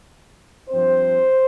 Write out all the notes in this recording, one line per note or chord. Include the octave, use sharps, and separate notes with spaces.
G2 F3 C4 C5